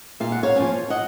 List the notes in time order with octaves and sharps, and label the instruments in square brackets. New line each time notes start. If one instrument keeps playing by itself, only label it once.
[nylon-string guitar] A#2 F5
F#5
C#5 F5
F3 A#3 C#4
D#5 F#5